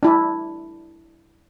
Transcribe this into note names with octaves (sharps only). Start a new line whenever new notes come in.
D4 E4